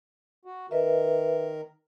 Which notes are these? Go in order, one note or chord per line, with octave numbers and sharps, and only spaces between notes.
F#4
D#3 A#4 B4 D#5 E5